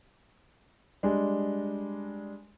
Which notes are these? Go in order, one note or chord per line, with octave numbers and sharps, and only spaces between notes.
G3 G#3 D4